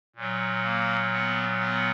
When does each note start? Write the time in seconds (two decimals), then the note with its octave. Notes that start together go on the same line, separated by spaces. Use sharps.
0.16 A#2 F#3
0.63 A#3
1.12 B3
1.60 B3